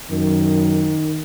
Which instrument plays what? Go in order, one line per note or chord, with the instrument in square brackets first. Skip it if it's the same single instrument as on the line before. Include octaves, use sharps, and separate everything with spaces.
[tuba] F#2 [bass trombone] D#3